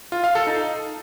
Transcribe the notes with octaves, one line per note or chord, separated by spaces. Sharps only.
F4
F5
A4
D#4